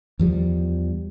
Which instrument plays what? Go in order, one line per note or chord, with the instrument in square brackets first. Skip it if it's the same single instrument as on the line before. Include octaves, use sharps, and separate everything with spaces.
[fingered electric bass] E2 F3 G3